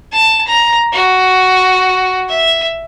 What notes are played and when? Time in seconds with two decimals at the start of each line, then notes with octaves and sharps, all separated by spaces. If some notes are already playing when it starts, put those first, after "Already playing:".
0.12 A5
0.48 A#5
0.92 F#4
2.29 E5